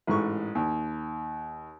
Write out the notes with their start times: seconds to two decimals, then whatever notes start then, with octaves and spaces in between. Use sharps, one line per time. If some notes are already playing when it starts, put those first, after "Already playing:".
0.07 A1 G#2 C#6
0.55 D#2